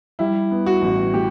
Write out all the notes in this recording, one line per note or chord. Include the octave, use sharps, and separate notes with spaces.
G3 E4
B3
F#4
A1
A2 G4